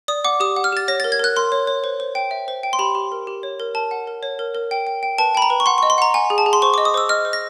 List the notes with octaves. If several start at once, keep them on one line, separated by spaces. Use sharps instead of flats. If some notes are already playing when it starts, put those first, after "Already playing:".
D5 D#6
F#5 D6
G4 D#6
F#5
F6
G4 A6
C#5 A#6
A6
A#4
G#6
A#4 F#6
A#4 C6
C#5
C#5
C5
C5
G5
E5
C5
G5
C6
G4 B5
G4
A#4
G4
C#5
A#4
A#4 A5
F#5
A#4
C#5
A#4
A#4
G5
G5
G5
B4 A5
G5 B5
A#5
B4
C#6
F#5 C6
C#6
D#5
C6
F#5 A#5
F#5 G#5
G#4
A5
G#4
C6
C5 C#6
D6
D#5
D#6
C5 E6
D#5 F6
C5
A#6